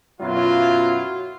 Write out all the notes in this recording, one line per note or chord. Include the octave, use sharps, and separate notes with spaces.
F#2 B2 F#3 E4 F4